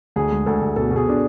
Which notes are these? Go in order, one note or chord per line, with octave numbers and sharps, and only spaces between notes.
D2 G#4
G#3
D2 A4
D2
B2 A4
B2
G#4
B2 D4